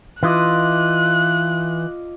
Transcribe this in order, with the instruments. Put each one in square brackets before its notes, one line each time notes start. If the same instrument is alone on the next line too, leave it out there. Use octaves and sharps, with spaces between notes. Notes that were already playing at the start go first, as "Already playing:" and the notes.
[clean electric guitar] E3 [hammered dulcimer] F4 D5 D#5 [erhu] F#6